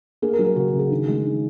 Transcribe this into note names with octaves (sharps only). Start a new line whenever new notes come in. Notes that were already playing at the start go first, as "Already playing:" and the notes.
A#3 G#4
A#4
F#3
A#4
C#3 F#4
F#4
C#3
G#4
D#3
G#3
D#3